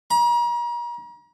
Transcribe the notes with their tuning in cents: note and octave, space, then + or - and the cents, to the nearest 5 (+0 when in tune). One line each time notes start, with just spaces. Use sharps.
A#5 +40